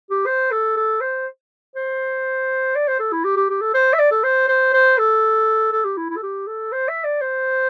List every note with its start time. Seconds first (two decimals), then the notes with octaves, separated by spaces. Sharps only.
0.10 G4
0.26 C5
0.51 A4
0.77 A4
1.01 C5
1.75 C5
2.75 D5
2.88 C5
3.00 A4
3.12 E4
3.24 G4
3.36 G4
3.49 G4
3.61 A4
3.74 C5
3.93 E5
3.99 D5
4.11 A4
4.23 C5
4.48 C5
4.73 C5
4.98 A4
5.72 A4
5.84 G4
5.97 E4
6.10 E4
6.16 A4
6.23 G4
6.47 A4
6.72 C5
6.88 E5
7.04 D5
7.21 C5